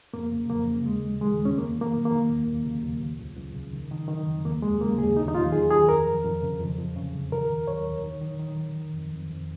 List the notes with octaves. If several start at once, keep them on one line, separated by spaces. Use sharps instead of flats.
F2 A#3
C#3
F2 A#3
C#3
D#2 G#3
D#2
D#3 G#3
D#2
C#4
F2 A#3
D#3
A#3
D#3
A#3
D#3
D#2
D#2
C#3
D#2
C#2
C#2
C#2
C#3
D#3
D#3
D#3
F2
D#2 A#3
D#2 G#3
C#3 A#3
D#2 G#4
D#2 D#4
D#4
D#2 F4
D#2 G#4
D#3 G#4
F2 A#4
F2
F2
C#3
F2
F2
C#3
F2
D#3 A#4
D#2
D#2 C#5
D#2
D#3
D#3
D#3
D#3
D#3
F2
F2
F2